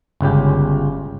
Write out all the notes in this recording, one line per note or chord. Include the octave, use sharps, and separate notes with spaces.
G1 C#2 C#3 G4